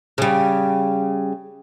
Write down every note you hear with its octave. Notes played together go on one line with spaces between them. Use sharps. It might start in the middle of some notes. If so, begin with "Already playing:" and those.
C#3 G3